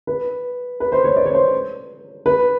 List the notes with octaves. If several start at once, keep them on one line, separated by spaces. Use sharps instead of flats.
B4
B4
C5
C#5
D5
C#5
C5
B4